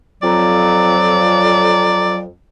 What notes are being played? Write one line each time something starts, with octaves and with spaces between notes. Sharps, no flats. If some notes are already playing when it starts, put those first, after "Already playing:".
F2 F#3 D5